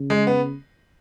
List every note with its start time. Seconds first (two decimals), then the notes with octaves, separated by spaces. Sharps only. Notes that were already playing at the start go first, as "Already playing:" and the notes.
Already playing: C#3
0.10 G#3
0.27 B3